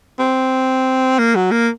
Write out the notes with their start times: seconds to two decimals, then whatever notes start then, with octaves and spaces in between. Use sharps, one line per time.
0.19 C4
1.19 A#3
1.35 F#3
1.51 A#3